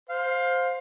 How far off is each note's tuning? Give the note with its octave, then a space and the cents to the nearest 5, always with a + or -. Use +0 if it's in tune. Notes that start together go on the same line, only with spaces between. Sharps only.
C5 +0 F5 +20